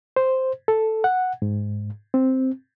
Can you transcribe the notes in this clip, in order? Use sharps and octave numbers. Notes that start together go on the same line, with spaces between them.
C5
A4
F#5
G#2
C4